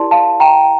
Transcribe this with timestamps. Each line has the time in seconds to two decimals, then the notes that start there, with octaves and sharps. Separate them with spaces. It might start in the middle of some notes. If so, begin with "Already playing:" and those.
Already playing: E4 G4 A#4 D5 A5 C6
0.11 F5 A5
0.40 G5 A#5